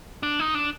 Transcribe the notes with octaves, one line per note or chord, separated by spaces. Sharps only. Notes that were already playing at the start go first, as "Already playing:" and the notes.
D4
D#4
D4